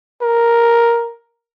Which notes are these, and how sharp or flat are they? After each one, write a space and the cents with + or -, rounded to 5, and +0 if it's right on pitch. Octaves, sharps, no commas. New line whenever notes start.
A#4 +5